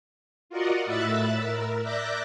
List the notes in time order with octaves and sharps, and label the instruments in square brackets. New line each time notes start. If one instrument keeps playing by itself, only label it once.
[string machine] F4 F#4 A#4 D5 D#5 F#5
A2 E5 B5 E6 F#6 A6
A#4
D5 E5 D6 F#6 G6 A#6